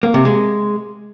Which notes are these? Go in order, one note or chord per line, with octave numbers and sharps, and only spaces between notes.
A#3
C3
G#3